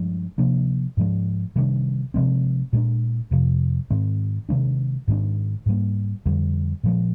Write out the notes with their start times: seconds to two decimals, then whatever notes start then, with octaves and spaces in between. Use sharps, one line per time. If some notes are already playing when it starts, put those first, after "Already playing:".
Already playing: G2 F3 G#3
0.38 C3 F3 A#3 D4
0.97 G#2 F3 G#3
1.56 C3 D#3 G3 D4
2.14 C3 F3 G#3 C4
2.73 A#2 G#3 D4
3.31 F2 C3 F3
3.90 G#2 D#3 G#3 C4
4.49 C3 D#3 G#3 D4
5.08 G#2 D#3 G#3 D4
5.66 G#2 G3 A#3
6.26 F2 D3 G3
6.84 A#2 F3 G#3